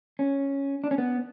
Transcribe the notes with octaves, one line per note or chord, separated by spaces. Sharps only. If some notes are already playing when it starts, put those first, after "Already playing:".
C#4
D4
C#4
B3